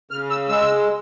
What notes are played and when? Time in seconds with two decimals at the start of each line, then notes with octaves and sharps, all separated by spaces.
0.11 C#3 F6
0.30 E6
0.48 G#3 E6